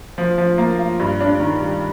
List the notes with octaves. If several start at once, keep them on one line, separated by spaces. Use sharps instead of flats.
F3
F3
A#3
F4
G2
D4
D#3
G3